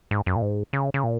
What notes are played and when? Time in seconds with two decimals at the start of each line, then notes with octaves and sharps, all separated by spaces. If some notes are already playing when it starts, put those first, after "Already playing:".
0.11 G#2
0.26 F#2
0.36 A#2
0.42 G#2
0.73 C#3
0.94 C#3
1.04 A#2